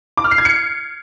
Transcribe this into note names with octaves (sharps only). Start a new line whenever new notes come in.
D6
F6
C7
G#6
C#7